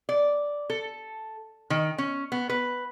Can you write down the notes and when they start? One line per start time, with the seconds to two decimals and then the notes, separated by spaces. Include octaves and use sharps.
0.09 D5
0.70 A4
1.70 D#3
1.98 C#4
2.32 B3
2.49 B4